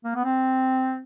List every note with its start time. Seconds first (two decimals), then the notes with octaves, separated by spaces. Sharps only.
0.04 A#3
0.15 B3
0.24 C4